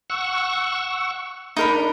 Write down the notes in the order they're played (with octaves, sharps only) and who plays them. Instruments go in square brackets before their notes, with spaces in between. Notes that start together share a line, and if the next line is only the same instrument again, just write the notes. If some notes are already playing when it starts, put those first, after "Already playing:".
[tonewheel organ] F#5 C#6 E6
[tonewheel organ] D4 [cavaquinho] D#4 A#4 B5